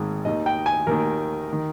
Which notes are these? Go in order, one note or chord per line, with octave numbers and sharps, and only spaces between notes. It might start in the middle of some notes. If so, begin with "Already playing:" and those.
Already playing: G#1 G#2 D#3
D#2 D#3 D#5
G5
G#5
D#2 D#3 A#4
D#3